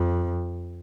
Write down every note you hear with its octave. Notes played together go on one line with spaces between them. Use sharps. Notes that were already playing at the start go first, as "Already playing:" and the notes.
Already playing: F2